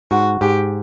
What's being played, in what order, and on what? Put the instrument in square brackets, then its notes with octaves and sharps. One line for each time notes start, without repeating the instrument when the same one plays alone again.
[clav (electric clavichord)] G#2 [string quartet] F#4
[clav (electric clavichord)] G#2 [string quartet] G4